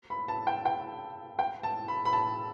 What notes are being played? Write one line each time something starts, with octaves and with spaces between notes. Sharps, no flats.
B5
A5
G5
G5
G5
A5
B5
B5
A5